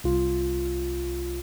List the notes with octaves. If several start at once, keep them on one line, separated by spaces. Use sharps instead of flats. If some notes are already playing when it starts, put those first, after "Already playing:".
C2 F4